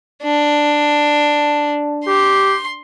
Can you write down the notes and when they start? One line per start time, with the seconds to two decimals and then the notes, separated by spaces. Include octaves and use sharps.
0.23 D4
2.06 G4 C6